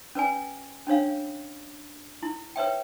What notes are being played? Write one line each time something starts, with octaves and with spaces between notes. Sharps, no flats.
C#4 B4 D5 G#5
C#4 D4 C#5 F5
E4
B4 C#5 E5 G5